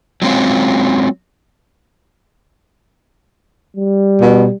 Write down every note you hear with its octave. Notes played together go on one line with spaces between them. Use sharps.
F#3 G#3 C4 C#4 F4
G3
B2